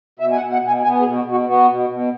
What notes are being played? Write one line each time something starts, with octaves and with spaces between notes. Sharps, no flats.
B2 E5
G#5
F#5
B2
F#5
B2
G#5
B3 G#5
G#4
B2
F#4
B2
F#4
B3 F#4
B2
B2